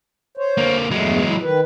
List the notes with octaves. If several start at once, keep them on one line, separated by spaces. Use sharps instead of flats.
C5 C#5
D3 A#3
E2 G2 F#3 G#3 A3
A2 E4
D#3 B4